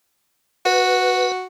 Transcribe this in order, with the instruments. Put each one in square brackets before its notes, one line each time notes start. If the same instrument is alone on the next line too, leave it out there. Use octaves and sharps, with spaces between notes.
[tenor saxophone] F#4 [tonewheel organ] B4